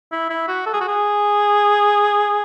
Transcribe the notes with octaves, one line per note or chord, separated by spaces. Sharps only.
E4
E4
F#4
A4
G#4
F#4
G#4